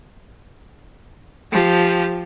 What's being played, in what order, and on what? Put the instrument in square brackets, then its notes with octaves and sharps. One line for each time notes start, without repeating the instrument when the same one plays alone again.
[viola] F3 G4